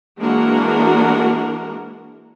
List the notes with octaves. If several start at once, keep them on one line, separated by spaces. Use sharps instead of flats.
E3 G#3 A#3 D4 F#4 A#4